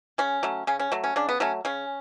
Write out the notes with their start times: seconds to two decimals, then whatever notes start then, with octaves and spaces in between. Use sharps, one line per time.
0.18 C#3 C#4
0.43 F#3 A3
0.67 C#3 C#4
0.79 C#4
0.92 F#3 A3
1.04 C#4
1.16 C#3 D4
1.29 B3
1.40 F#3 A3 C#4
1.65 C#3 C#4